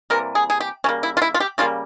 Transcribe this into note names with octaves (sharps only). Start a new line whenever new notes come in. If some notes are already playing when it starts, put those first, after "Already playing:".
C3 E3 G3 A#3 A#4
G#4
G#4
G4
C#3 G3 A#3 C#4
E4
F4
E4
F4
G4
C#3 G3 A#3 F4